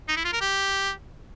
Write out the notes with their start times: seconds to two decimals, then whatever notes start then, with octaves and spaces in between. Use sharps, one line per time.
0.08 D#4
0.17 E4
0.25 F4
0.33 A#4
0.41 G4